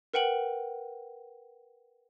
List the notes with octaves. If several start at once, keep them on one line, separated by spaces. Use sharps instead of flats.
A#4 B4 F#5 G5 F#7